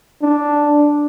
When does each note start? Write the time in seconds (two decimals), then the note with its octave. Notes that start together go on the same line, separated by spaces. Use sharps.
0.22 D4